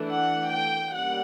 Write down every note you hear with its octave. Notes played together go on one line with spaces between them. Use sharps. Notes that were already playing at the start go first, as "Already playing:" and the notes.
Already playing: E3 A3 D4
F#5
G5
G3 A#3 C#4 F#5